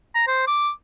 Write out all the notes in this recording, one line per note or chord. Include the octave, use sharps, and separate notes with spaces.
A#5
C5
D6